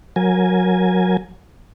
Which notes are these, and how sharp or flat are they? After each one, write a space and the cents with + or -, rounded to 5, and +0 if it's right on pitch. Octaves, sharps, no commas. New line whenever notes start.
F#3 -15 A#4 +0 G#5 +0